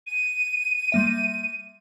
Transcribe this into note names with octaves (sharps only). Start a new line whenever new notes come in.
D#7
G3 A#3 E5